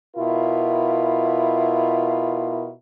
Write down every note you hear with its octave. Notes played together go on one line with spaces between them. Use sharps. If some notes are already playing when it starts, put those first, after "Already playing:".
B2 E4 F4 A#4